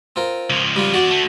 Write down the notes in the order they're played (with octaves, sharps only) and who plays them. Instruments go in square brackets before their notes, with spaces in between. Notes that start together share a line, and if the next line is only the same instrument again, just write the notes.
[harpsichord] C4 F4 A#4
[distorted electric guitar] C#2 F3
[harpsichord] G3 F4
[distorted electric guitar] E2 D5 [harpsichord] F#4
[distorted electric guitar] D3 A3